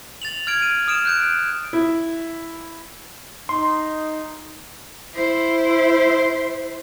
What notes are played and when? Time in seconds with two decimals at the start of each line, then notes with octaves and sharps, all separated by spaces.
0.22 A6 F7 F#7
0.47 F6 G#6 D7
0.62 D#7
0.87 D#6 F6 D7 E7
1.05 F#6 G6 D7
1.73 E4
3.49 D#4 C6
5.13 E4 C5